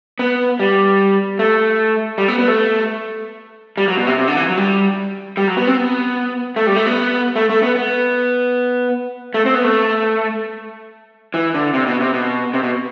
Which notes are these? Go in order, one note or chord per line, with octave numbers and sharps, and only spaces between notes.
B3
G3
A3
G3
B3
B3
A3
G3
F#3
B2
C3
C3
D3
E3
F#3
G3
G3
F#3
B3
C4
B3
A3
G3
A3
B3
A3
A3
B3
B3
A3
C4
B3
A3
E3
D3
C3
B2
C3
B2
C3
B2